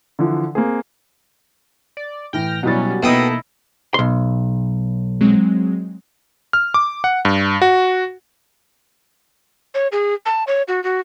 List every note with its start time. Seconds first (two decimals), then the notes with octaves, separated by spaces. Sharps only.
0.19 D3 E3 F3
0.55 A#3 C4 G#4
1.97 D5
2.33 A2 E3 G5 F6 A#6
2.63 B2 F#3 G3 B3 C#4 E4 A6
3.03 B2 A#3 D#4 E4 A4 D#5 G5 D#6
3.94 B1 C6
5.21 F#3 G#3 C4
6.53 F6
6.74 D6
7.04 F#5
7.25 G2
7.62 F#4
9.74 C#5
9.92 G#4
10.26 A5
10.47 C#5
10.68 F#4
10.84 F#4